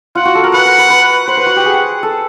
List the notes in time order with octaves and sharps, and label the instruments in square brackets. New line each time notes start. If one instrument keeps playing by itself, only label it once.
[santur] F4 [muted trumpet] F#5
[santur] F#4
A4
A#4
[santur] B4 [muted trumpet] F#5
[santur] A#4
B4
B4
[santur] C5 [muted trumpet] F#5
[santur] B4
F#4
G4
G#4
A4